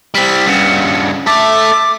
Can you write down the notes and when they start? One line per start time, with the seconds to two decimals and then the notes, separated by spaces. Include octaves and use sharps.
0.14 G3 C4 B6
0.46 G2 C#3 F#5
1.26 A4 E5 D6